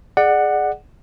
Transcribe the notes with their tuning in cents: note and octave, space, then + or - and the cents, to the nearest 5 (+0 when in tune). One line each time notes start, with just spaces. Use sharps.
G#4 +10 D5 +25 F#5 +0